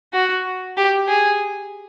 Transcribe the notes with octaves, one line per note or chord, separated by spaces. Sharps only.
F#4
G4
G#4